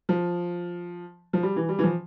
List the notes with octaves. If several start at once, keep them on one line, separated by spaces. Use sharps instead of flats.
F3
F3
G3
E3
G3
E3
F3